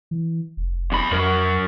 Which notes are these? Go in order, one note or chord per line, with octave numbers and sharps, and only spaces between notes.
E3
F1
E2 B5
F2 F#3 A#4